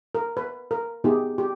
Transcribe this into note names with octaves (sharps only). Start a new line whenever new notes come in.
A#4
B4
A#4
B3 D#4 G4 G#4
G4